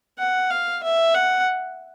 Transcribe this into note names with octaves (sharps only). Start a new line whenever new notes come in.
F#5
F5
E5
F#5